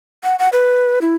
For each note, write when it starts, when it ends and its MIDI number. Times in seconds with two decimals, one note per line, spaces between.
0.24 0.36 78
0.39 0.49 78
0.53 0.99 71
1.01 1.15 64